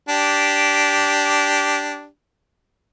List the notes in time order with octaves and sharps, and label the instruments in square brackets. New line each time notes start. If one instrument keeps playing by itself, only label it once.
[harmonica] D4 G4